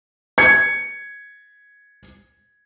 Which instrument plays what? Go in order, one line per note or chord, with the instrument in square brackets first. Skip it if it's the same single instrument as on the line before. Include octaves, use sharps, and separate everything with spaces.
[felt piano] G#6 C#7